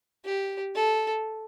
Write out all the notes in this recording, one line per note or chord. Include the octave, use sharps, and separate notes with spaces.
G4
A4